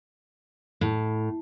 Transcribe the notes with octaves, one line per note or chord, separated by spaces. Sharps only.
A2